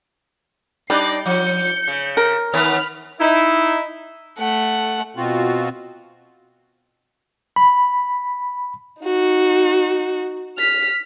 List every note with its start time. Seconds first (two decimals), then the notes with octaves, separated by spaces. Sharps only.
0.90 G3 D4 D#4 D5 C7
1.26 F3 G6 C#7
1.88 C#3
2.17 A#4
2.54 D#3 B3 C#5 B5 F6
3.20 D#4 E4
4.39 A3 F#5
5.15 B2 C4 F4 F#4
7.56 B5
9.02 D#4 F#4
10.58 F6 B6